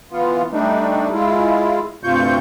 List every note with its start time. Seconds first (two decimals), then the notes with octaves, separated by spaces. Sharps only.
0.12 E3 B3 F4
0.52 G3 A3 D4 D#4
1.12 G#3 E4 F4
2.04 D2 G2 C3 F4 C#6 G6